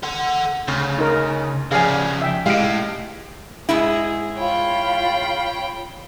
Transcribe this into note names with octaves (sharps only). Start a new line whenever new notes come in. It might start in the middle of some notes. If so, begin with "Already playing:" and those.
A4 F#5
D2 C#3
D#4 A#4
C#3 F3 G#4 D5 F5 G#5
E5 G5
A2 G#3 G4 F5 D7
G#2 G#3 E4 G#4
F4 C#5 G5 B5